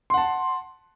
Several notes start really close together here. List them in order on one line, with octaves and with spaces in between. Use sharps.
C6 F#5 A5